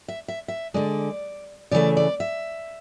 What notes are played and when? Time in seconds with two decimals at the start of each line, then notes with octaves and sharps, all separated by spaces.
0.08 E5
0.28 E5
0.48 E5
0.74 D3 G#3 D5
1.71 C#3 E3 A3 D5
1.97 D5
2.20 E5